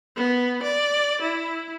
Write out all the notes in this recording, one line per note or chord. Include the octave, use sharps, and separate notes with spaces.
B3
D5
E4